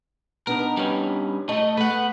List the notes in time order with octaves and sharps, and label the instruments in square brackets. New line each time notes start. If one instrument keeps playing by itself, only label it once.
[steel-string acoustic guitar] B3 D4 D#4 [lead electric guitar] A#4
[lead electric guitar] G3 C#4
[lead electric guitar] A3 A4 [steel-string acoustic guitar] D#5
[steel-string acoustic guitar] A3 [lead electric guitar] B4 F#5